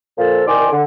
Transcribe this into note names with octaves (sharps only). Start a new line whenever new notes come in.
A#2 F3 A4
C2 D#3 D5 G#5 C6 D6
D3